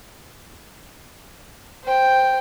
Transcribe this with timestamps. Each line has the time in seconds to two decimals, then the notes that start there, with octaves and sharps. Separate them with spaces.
1.84 C5 G5